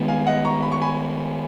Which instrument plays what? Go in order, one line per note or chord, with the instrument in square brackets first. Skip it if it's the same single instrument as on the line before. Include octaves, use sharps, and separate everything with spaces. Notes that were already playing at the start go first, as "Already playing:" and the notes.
Already playing: [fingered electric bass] D#3 G#3 B3
[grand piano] F5 G#5
D#5 F#5
A#5 C#6
B5
C#6
G#5 B5